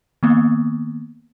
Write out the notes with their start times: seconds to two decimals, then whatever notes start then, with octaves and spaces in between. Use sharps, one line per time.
0.23 D#3 A#3 B3